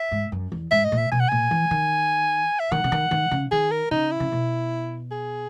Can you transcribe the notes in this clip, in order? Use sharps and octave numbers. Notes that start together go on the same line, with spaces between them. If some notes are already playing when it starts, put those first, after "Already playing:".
Already playing: E5
G#2
F#2
E2
G#2 E5
D#5
A#2
E5
B2 G#5
F#5
A#2 G#5
E3
D#3
E5
D#3 F#5
C#3
D#3
D#3
C#3
D#3 G#4
A#4
C#3 D#4
E4
C#3
B2
G#4